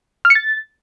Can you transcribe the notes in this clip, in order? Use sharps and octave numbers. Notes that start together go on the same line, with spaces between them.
F6
C#7
A6